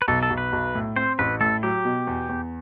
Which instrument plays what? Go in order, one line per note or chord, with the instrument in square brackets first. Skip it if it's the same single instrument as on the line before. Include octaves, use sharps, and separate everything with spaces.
[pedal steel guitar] B4
[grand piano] B1 [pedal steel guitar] A4
[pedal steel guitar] A4
[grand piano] B1
[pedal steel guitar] B4
[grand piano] B1
A2
[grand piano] C4 [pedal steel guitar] C5
[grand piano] A1 [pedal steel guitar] B4
[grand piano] A2 [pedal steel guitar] A4
[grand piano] F#3 [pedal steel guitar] G4
[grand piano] B2
E2
E2